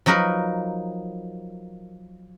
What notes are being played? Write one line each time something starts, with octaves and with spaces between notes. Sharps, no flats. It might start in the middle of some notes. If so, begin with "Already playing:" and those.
F3 F#3 D#4 A#4 B4